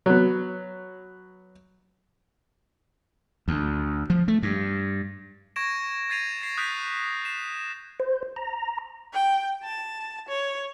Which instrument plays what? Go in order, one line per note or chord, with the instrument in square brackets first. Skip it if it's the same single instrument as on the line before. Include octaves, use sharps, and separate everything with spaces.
[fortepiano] F#3 B3
[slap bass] D2
F3
A3
G2
[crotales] C#6 G#6 A#6 D7 E7
G#6 A6 C7 D#7 F7
A#6 C7
D#6 F#6 G6 B6 C7 D7
C7 E7
[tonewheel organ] C5
A#5
[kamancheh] G5
A5
C#5